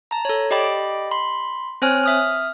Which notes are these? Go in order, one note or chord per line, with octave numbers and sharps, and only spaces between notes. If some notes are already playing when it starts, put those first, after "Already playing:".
A5 A#5
A4 C#5
G4 D5 D#5 G5 B5 D6
B5 C6
C4 C5 C#5 G#5 F6 F#6
E5 D#6 F6